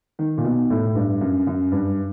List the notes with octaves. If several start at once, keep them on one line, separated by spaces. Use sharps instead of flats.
D#3
A#2
B2
A2
G2
F#2
F#2
G2